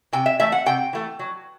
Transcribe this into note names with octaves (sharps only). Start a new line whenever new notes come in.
C3 G5
E5
E3 A3 E5
F#5
C3 G5
E3 A3
F#3